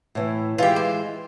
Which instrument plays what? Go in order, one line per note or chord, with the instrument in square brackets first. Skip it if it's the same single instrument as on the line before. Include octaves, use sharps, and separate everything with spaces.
[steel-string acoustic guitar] A2 E3
[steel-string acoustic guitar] E3 G#3 [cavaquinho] F4 G4
[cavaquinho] C5